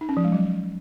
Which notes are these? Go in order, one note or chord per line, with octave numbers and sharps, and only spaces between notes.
D#4
C#4
F3
G#3
F#3